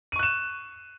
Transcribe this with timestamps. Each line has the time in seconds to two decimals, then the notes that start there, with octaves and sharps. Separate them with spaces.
0.12 D#7
0.16 C#6
0.19 F#6
0.23 E7